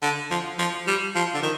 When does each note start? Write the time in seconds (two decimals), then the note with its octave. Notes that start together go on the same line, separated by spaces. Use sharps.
0.02 D3
0.31 F3
0.59 F3
0.87 G3
1.15 F3
1.34 D3
1.43 D#3